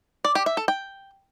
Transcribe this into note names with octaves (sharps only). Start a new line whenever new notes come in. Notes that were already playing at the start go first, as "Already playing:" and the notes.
D5
G4
E5
A4
G5